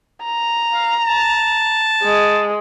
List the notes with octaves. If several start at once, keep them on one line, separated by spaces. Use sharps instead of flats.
A#5
F5
A5
G#3